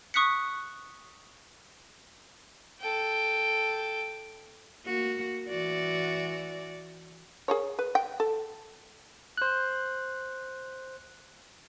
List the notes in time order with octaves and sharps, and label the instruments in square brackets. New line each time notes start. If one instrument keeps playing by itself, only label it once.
[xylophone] C#6 D#6 F#6 B6 C#7
[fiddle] A4 G5
[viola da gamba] A#3 F#4
E3 F#4 D5
[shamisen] G#4 A#4 C#5
B4
G5
A4
[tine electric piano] C5 F#6